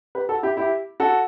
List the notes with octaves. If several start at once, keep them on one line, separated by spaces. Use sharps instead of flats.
G4 B4
F#4 A4
E4 G4
E4 G4
F#4 A4